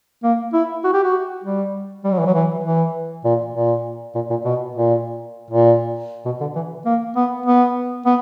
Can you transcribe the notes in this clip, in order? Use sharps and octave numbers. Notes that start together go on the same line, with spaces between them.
A#3
E4
F#4
G4
F#4
G3
G3
F#3
E3
F#3
E3
E3
A#2
A#2
A#2
A#2
B2
A#2
A#2
B2
D3
E3
A#3
B3
B3
B3